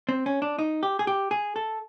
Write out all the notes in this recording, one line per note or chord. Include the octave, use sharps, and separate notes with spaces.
C4
C#4
D4
D#4
G4
G#4
G4
G#4
A4